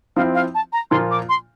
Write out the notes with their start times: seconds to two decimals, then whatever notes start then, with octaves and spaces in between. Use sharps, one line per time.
0.16 F3 C4 E4 F5
0.35 F5
0.55 A5
0.73 A#5
0.91 A#2 F3 A#3 F4 C6
1.11 D6
1.29 C6